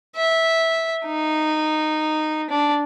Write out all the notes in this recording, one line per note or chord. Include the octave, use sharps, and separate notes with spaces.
E5
D#4
D4